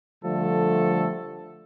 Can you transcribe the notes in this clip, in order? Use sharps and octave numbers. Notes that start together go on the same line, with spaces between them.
D3 F3 G3 A3 A4